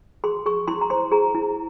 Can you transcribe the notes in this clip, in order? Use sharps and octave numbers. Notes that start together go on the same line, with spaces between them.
G#4 C6
G#4 C#6
E4 C6
A#5
C5 C6
G#4 A#5
E4